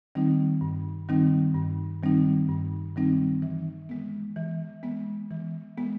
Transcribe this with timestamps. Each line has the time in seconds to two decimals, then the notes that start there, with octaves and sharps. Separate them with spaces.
0.15 D#3 G3 C4 D#4
0.61 G2
1.09 D#3 G3 C4 D#4
1.55 G2
2.03 D#3 G3 C4 D#4
2.49 G2
2.96 D#3 G3 C4 D#4
3.42 E3
3.89 G#3 B3
4.36 E3
4.83 G#3 B3
5.31 E3
5.78 G#3 B3